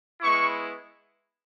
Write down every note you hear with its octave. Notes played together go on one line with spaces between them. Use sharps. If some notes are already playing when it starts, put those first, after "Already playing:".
G#3 B3 E4 C#6